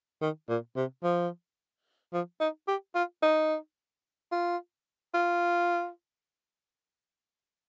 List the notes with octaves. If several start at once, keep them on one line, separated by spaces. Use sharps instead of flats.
D#3
A#2
C3
F3
F3
D#4
G4
F4
D#4
F4
F4